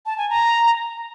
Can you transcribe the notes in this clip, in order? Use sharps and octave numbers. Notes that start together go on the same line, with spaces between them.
A5
G#5
A#5